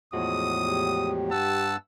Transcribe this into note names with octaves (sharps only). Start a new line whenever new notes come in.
E2 A2 F3 G#3 F#4 D#6
G4
G2 F#5 A5 E6